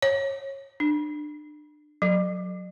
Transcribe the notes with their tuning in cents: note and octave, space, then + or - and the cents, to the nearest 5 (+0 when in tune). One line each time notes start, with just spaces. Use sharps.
C#5 -20
D4 +35
F#3 -20